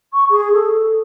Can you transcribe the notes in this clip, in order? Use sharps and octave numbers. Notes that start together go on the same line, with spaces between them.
C#6
G#4
A4